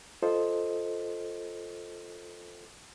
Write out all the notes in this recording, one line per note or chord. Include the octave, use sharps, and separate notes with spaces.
F4 A4 C5 D#5